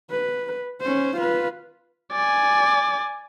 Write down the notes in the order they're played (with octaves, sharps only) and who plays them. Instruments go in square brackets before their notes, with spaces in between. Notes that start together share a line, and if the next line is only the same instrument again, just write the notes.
[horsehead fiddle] B4
C#4 C5
F4 B4
[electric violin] D5 G#5